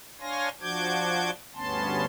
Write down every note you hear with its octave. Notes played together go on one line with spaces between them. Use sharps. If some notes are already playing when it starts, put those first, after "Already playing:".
D4 C#5 F5 G#5 C6 A#6
F3 D4 F#4 D6 G6 G#6
D2 G2 B3 C#4 A5 C6